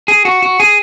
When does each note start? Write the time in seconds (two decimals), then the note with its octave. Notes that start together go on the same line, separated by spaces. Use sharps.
0.08 G#4
0.25 F#4
0.42 F#4
0.60 G#4